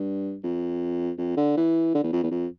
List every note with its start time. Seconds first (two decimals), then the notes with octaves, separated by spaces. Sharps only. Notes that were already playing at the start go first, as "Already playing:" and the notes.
Already playing: G2
0.44 F2
1.18 F2
1.37 D3
1.57 E3
1.95 D3
2.03 E2
2.13 F2
2.23 E2
2.31 F2